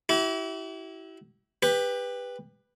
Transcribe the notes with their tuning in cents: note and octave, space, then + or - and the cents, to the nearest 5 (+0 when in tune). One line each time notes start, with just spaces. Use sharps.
E4 -10 G4 -45
G4 +25 B4 +0